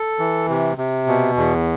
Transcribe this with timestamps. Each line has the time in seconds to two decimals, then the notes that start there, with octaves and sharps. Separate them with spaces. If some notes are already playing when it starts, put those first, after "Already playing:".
Already playing: A4
0.19 E3
0.49 C3
0.78 C3
1.07 B2
1.37 E2